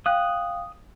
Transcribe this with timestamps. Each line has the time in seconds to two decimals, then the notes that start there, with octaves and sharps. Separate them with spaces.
0.06 F5 G5 D#6 F#6